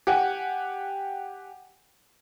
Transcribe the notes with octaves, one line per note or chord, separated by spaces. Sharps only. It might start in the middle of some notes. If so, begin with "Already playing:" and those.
G4 F#5 G#5